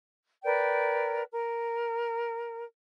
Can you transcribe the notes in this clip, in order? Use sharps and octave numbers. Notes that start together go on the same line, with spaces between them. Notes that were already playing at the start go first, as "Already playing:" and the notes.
A#4 B4 D5 G5
A#4